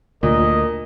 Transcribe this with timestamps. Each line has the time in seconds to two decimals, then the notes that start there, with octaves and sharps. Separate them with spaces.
0.23 D2 A#2 A#4 D#5